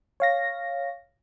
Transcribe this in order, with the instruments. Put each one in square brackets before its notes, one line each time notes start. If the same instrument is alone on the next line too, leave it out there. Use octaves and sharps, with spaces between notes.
[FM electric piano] C#5 F5 A#6